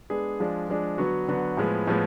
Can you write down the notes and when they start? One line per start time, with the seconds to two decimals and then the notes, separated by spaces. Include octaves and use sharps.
0.10 G#3 B3 D4 G#4
0.40 F3 G#3 D4
0.69 F3 G#3 D4
0.98 D3 F#3 B3 F#4
1.28 D3 F#3 B3 F#4
1.57 A2 F3 G#3 B3
1.87 A2 F3 G#3 B3